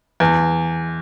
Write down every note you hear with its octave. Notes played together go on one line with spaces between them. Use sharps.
E2